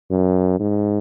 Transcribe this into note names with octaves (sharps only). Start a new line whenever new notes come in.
F#2
G#2